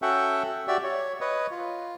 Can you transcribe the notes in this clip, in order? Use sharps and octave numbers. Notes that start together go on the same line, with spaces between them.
C#4 F#4 A4 E5 F#5 G5
F#4 G4 D5 E5 E6
C#5
B4 C#5 D#5
F4